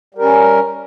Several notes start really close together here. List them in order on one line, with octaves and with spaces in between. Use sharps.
G3 A#4 C#4